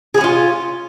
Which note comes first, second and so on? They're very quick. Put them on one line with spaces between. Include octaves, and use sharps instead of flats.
G#4 B3 C#4 F4